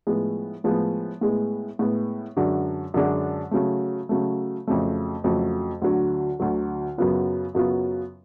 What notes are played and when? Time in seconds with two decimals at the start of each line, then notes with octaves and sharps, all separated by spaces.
0.07 A2 F3 G#3 B3
0.64 A2 F3 G#3 B3
1.21 A2 G#3 B3
1.79 A2 G#3 B3
2.37 F#2 D3 G#3 D4 F#4
2.94 F#2 D3 G#3 D4 F#4
3.51 C#3 F#3 A3
4.09 C#3 F#3 A3
4.67 F2 C#3 F#3 A3
5.24 F2 C#3 F#3 A3
5.82 D2 D3 F#3
6.40 D2 D3 F#3
6.98 F#2 C#3 F#3 B3 F4
7.55 F#2 C#3 F#3 B3 F4